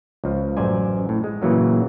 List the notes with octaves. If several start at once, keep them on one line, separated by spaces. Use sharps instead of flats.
C#2 F3
A1 F#2 C5 D5 G#5
A2
G#3
A#2 C#3 E3 F#3 A#3